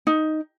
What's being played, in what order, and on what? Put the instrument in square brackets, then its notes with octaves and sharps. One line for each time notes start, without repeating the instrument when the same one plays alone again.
[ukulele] D#4